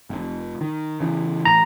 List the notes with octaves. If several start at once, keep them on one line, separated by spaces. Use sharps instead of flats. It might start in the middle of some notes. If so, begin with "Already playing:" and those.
F1
D#3
C#3 E3
A1 A#5